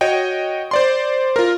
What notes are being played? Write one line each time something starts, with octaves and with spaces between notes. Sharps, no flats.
F#4 C#5 D#5 G5
C5 D5 C6
F4 A#4